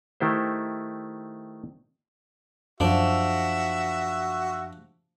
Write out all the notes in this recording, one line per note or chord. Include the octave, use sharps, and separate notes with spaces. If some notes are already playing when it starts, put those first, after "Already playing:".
D#3 A3 E4 G4 C5
F#2 F3 D4 F#4 E5